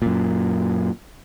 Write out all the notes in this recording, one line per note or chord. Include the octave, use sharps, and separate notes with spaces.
F#2 A#2